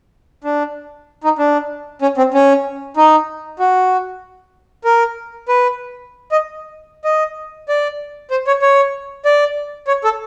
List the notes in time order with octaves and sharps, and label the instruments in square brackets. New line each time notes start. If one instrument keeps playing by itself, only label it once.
[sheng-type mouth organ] D4
D#4
D4
C#4
C4
C#4
D#4
F#4
A#4
B4
D#5
D#5
D5
C5
C#5
C#5
D5
C#5
A4